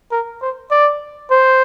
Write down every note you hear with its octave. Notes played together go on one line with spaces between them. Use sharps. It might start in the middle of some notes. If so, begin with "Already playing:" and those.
A#4
C5
D5
C5